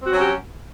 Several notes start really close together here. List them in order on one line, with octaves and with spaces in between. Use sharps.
C4 F#4 F#3 C#4 G4